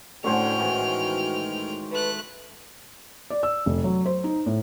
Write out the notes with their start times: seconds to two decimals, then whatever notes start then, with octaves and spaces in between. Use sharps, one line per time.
0.24 A2 D3 A3 C#4 F#4 C5 G5 F6
0.59 G#2 D#3 E3 F#4
1.92 A3 B4 F#6
3.30 D5
3.43 E6
3.66 F1
3.84 F#3
4.06 C5
4.24 D#4
4.46 A2